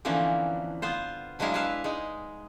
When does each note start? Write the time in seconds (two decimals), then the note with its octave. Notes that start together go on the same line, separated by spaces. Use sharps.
0.05 D3 E3 F3 A#3 C4 C#4
0.82 B3 F4 C5
1.39 F3 F#3 G#3 D4 E4 F5
1.54 E4 B4 E5 F5
1.84 G#3 D#4